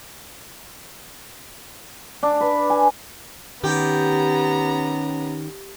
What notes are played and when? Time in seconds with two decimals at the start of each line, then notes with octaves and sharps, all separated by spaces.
2.23 D4
2.41 B4
2.70 G#5
3.64 D#3 B3 C#4 G4 A#5